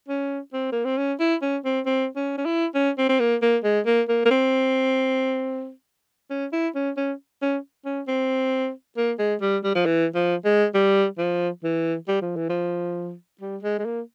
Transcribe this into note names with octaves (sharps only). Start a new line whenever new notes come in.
C#4
C4
A#3
C4
C#4
E4
C#4
C4
C4
C#4
C#4
E4
C#4
C4
C4
A#3
A#3
G#3
A#3
A#3
A#3
C4
C#4
E4
C#4
C#4
C#4
C#4
C4
A#3
G#3
G3
G3
F3
E3
F3
G#3
G3
F3
E3
G3
F3
E3
F3
G3
G#3
G#3
A#3